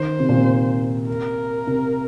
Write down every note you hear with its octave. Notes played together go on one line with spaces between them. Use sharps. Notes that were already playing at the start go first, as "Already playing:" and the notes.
Already playing: D#3 C5
C3
A#2
C3
A#4
C3